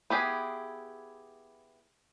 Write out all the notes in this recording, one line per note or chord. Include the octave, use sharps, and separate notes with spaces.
B3 E4 G4 G#4